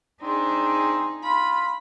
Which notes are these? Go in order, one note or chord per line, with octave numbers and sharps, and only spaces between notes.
C4 D4 D#4 G#4
F4 B5